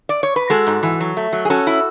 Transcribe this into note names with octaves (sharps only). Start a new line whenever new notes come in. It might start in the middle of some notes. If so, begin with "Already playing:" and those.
D5
C#5
B4
G#3 F#4 A4
G#2
E3
F#3
A3
F#3
G#4
C#4 F#4 A4
E4